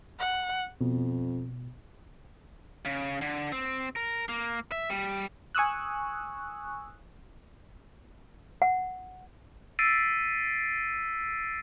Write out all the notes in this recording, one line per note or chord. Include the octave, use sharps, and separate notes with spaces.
F#5
F2 B2
C#3
D3
C4
A#4
A#3
E5
G3
G#5 C#6 D#6 E6 F#6
F#5
E6 A6 B6 C7 D7 D#7